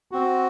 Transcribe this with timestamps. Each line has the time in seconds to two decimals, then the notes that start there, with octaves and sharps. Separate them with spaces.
0.11 C4 F#4